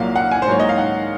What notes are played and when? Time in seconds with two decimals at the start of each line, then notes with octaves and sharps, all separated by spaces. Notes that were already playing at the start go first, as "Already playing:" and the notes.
Already playing: C2 A#2 F#3 A#3 F5
0.16 F#5
0.32 G#5
0.42 C5
0.46 G#2 F#3 A#3 C#5
0.60 D#5
0.69 F5
0.78 F#5